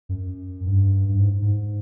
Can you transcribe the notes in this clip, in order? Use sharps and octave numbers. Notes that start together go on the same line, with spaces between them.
F#2
G2
G2
G#2
G#2